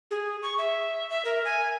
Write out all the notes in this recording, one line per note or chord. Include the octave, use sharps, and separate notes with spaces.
G#4
C#6
E5
E5
A#4
G#5